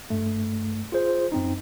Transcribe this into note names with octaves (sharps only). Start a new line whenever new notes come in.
G2 A3
F4 G#4 C5
F#2 C4 D#4